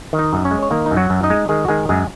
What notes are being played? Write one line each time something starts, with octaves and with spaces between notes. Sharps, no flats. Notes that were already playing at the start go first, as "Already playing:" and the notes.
D#3
D#4 D#5
F#2
C#4 C#5
G#3
C#5
D#3 A#3 A#4
D#4
F#2
F#3 F#4
F#2
D#4 D#5
G#3
D#3 G#3 G#4
F#4
D#3 G#3 G#4
F#2 G#3 G#4